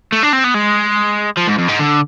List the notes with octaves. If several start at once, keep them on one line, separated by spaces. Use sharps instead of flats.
A3
D4
C4
B3
G#3
F3
G#2
F2
G#2
D3